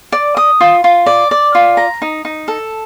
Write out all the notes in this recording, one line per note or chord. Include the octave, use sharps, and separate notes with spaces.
D5
D#6
F4
F4
D5
D5
F4
A#5
D#4
D#4
A4